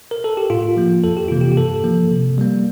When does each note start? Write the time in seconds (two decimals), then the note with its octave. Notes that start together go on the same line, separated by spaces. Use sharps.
0.11 A#4
0.24 A4
0.37 G4
0.50 A2 F4
0.77 F3 A#3
1.04 F2 A4
1.17 G4
1.28 C3 E3 A#3 F4
1.41 G4
1.52 G4
1.57 G2 A4
1.84 F3 A#3
2.11 C3
2.38 G3 A#3